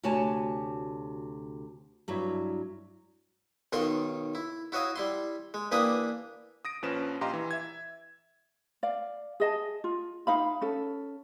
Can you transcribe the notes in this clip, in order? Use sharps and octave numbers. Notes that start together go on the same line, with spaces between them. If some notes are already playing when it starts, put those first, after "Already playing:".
D2 C3 F#4 C#5 G#5 A5
G2 F#3 E4
B1 D#3 F4 A#4 C6 C#6
E4
E4 F#4 C#5 D#5 F5
G3 E4 C6
G#3
E3 A#3 D4 G4 B5 D#6
D#6 A#6 D7
A#1 F3 C#4 B4 E7
A#1 G4 D#5 F5 A#5 C6
E3
E5 G#6
D5 F5
G#4 D#5 A5
F4
D#4 F5 B5
C#4 A4